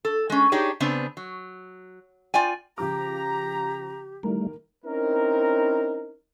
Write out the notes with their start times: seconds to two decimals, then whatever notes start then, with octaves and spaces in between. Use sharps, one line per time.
0.05 A4
0.30 G#3 C#4
0.52 D4 D#4 G4 G#4 C#5
0.80 C#3 B3 C4 D4
1.17 F#3
2.34 F4 D5 G5 G#5
2.78 C#3 F3 G4 A#5 D6
4.23 D#3 E3 G3 A3 A#4
4.85 C4 C#4 D#4 E4 A#4